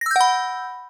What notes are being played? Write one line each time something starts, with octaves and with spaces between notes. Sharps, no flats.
F#5 B5 E6 G6 A#6